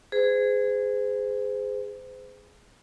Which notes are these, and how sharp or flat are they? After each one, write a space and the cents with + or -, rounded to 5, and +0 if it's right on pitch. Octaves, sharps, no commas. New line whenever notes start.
G#4 +0 C5 -35